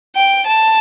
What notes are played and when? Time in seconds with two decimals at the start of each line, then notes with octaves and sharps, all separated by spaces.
0.16 G5
0.46 A5